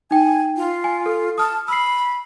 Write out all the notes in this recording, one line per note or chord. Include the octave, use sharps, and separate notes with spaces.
D#4 G5 G#5
F4
G#5
A4
A5 D#6 F6
B5 E6 C7